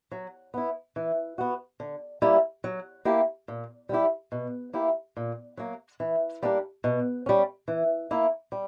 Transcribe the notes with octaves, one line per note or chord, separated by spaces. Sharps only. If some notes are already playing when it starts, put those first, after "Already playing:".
F#3
B3 E4
E3
B3 F#4
D3
G3 A#3 E4 G4
F#3
A#3 E4 G4
A#2
G3 B3 E4 G4
B2
A#3 E4 G4
A#2
F#3 A#3
E3
G3 A#3 D4
B2
G3 C#4
E3
A#3 E4
G3